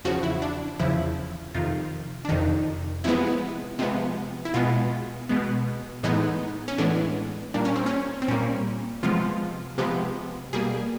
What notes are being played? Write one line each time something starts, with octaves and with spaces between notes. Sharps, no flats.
E2 C#3 F3 F#4
E4
D4
E2 C#3 F3 E4
F2 C3 D#3 F4
D4
F2 C3 D#3 D#4
C3 F3 G#3 B3 E4
C3 F3 G#3 B3
E4
B2 G#3 B3 F4
B2 G#3 B3
A2 E3 G#3 B3 D#4
C#4
A2 E3 G#3 B3 D4
A#2 G3 A#3 D4
C#4
C4
C#4
C4
A#2 G3 A#3 C#4
C3 F3 G#3 B3 F4
C3 F3 G#3 B3 G4
B2 G3 A#3 G#4